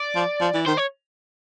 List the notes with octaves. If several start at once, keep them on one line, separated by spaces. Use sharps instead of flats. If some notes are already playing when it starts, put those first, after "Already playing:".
Already playing: D5
F3
F3
E3
D#3 C5
C#5